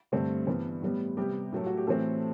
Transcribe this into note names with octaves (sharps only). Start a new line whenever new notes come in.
G2 D3 A3 C4
G2 E3 G3 B3 C5
A2 G3 B3
C3 G3 B3 G4
A2 F#3 A3
F#4
G4
A2 E3 A3 C4 A4